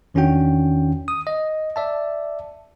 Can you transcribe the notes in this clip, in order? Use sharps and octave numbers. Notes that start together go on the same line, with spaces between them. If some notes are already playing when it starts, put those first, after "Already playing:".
E2 D#3 C#4 D4 F#4 G5
D#6
D#5
D5 E5 A5